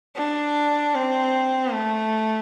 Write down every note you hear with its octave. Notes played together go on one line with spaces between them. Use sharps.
D4
C4
A3